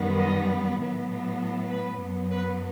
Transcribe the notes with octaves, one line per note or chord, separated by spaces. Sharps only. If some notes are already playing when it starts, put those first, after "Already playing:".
Already playing: F#2 D#3 G3 B3
D#5
A2 F#3 B3
B4
F#2 F#3 B3
B4